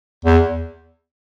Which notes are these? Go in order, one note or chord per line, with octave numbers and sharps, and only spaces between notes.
E2